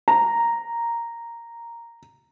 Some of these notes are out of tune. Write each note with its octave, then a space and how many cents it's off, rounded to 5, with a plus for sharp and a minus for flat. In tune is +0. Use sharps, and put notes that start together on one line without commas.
A#5 -5